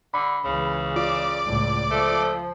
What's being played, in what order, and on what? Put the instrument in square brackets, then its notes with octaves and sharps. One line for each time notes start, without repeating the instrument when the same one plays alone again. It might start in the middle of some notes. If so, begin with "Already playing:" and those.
[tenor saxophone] D3 [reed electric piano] B5
[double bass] C#2 E3 [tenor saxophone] C#3
[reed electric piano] F4 [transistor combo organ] D5
[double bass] C#2 A2
[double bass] F3 [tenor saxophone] A3